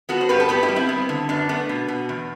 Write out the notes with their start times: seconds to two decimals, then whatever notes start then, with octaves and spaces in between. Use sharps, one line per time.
0.09 B3 F#4 A4
0.21 C5
0.29 G2 G4 B4
0.40 A4
0.49 B3 G4 B4
0.63 E4 G4
0.69 G3
0.76 C4 E4
0.89 B3
1.09 D3
1.29 F#2 B3 D4
1.49 A3 B3
1.69 B2
1.88 B2
2.09 E2